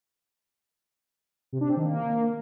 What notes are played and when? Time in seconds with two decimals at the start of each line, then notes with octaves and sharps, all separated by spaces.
1.53 C3
1.61 D4
1.69 C4
1.77 D#3
1.85 A#3